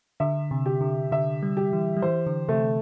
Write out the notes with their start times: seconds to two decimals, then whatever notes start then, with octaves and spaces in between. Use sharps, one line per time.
0.20 D3 E5
0.51 C3
0.66 G4
0.81 D3
1.12 D3 E5
1.43 G3
1.57 G4
1.73 E3
1.97 G3
2.02 E3 C5
2.26 D3
2.49 C3 A3